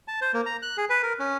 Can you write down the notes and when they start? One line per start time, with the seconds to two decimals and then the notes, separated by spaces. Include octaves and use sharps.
0.08 A5
0.21 C5
0.34 A#3
0.46 A#5
0.62 F#6
0.77 G#4
0.90 B4
1.03 A#4
1.19 C#4